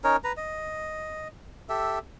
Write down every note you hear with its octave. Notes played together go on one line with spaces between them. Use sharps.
C#4 D#4 A#4 C#5
B4 A#5
D#5
G4 A4 E5